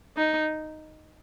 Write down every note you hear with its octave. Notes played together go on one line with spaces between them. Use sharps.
D#4